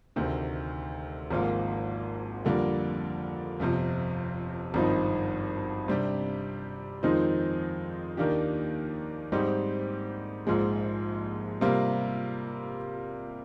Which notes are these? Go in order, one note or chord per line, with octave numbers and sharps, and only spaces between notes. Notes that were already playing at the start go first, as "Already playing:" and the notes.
D2 C3 D#3
G#1 G#2 F3 A#3 F4
F2 D3 G3 A#3
G1 F2 C3 F3
G#1 G2 F3 C4 D#4
C3 G3 D4 G4
F2 D#3 G#3 C4 D#4
D#2 D#3 A#3 D4 G4
G#2 G3 C4 D#4 G4
A#1 G#2 F3 G#3
C3 G3 A#3 F4